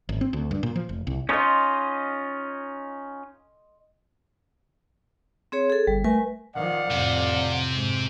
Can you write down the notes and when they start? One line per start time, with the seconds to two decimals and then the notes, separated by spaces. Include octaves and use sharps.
0.09 G#1
0.21 C4
0.33 D2
0.51 G2
0.63 A#2
0.76 F3
0.89 F1
1.07 C2
1.29 C#4 D#4 F4 D#5 C6
5.52 C4 G#4 C#5
5.70 G#4 A4
5.87 G1 G3
6.04 A3 A#4 B4 G#5
6.55 D#3 F3 D5 F5 F#5
6.91 F2 A2 C3
7.73 G#2